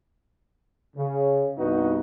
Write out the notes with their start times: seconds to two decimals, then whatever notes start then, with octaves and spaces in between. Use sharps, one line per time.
0.96 C#3
1.58 C2 G2 B3 D#4 F#4